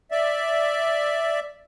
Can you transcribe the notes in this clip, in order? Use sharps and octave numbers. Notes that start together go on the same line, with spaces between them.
D5 E5